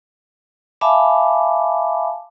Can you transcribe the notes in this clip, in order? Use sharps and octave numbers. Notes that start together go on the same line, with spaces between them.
E5 F5 G#5 A5 B5 D6